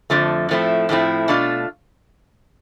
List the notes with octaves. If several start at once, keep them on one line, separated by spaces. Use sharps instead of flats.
F2 D3 F3 A3
A2 F3 A3 C4 E4
A2 F3 A3 C4 E4
B2 A3 D4 F4